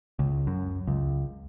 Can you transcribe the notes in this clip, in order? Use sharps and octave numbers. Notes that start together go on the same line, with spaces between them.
C#2
F#2
C#2